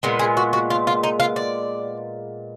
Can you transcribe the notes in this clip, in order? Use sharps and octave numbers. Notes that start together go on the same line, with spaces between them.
A#2 G#3 B3 A#4
G#4
F#4
F#4
F4
F4
D#4
F4
D5